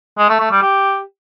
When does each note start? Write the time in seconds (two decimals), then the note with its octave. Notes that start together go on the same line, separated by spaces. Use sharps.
0.18 G#3
0.29 A3
0.40 A3
0.51 G3
0.63 G4